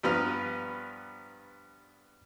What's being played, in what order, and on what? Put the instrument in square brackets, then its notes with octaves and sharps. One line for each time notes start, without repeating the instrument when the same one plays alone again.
[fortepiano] G2 F3 B3 B4 A#5 F6